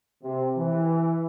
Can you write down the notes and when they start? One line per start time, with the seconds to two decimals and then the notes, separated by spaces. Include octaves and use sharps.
0.23 C3
0.56 E3